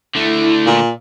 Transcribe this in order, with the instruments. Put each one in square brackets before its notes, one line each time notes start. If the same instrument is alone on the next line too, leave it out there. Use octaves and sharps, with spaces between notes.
[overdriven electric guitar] D3 A3 [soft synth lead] E4
[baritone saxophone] A#2